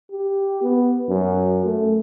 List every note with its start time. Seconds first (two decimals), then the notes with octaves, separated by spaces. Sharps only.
0.11 G4
0.63 B3
1.08 F#2
1.65 A3